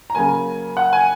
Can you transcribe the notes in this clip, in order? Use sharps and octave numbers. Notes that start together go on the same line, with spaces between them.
A#5
C#3 F#3 A#3 G#5
F#5
G#5